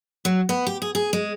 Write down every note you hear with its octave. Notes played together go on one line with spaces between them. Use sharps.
F#3
B3
G4
G#4
G#4
G#3